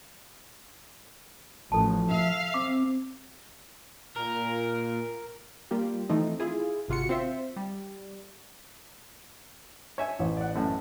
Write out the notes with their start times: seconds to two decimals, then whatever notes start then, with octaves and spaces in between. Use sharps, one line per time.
1.72 A1 F3 A4 A5
2.09 E5 F5
2.54 C4 D6
4.17 A#2 A#4
5.71 G3 A#3 F4 G4
6.09 E3 F3 A3 C4 D#4
6.40 E4 F4 G#4
6.88 G#1 C3 F4 F#4 C#7
7.09 C4 F4 C5 E5
7.56 G3
9.98 C#5 E5 G#5
10.19 A1
10.37 D5 F#5
10.55 F#2 A2